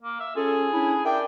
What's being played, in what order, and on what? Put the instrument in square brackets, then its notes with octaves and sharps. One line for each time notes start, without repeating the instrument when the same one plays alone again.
[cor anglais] A#3
E5
[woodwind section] C#4 F4 A4 [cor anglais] G#4
[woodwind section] C#4 D4 E4
[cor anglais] D4 [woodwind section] A#4 E5 G5